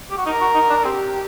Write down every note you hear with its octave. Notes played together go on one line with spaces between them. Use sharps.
G4
F#4
D#4 A#4
F#4
D#4
D4
C4 G4